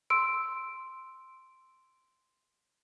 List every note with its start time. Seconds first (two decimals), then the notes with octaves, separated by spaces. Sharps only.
0.10 C6 E6 D7